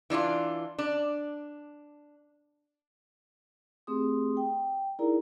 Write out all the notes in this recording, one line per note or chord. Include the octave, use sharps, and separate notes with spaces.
E3 D4 E4 F4
D4
A3 C4 G4 G#4 C6 D#6
G5
D#4 E4 G#4 A#4 D5 A#5